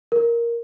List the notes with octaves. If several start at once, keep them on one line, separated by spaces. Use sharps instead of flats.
A#4